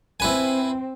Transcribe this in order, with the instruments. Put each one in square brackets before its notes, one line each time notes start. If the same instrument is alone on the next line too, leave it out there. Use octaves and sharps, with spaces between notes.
[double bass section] C4 [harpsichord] E4 B4 G#5